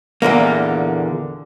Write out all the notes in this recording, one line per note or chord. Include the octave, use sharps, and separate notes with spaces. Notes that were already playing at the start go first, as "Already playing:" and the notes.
E2 A#2 D3 A#3